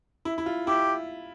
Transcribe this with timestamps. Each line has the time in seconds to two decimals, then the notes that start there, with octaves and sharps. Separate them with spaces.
0.25 E4
0.38 E4
0.46 F4
0.67 E4 G4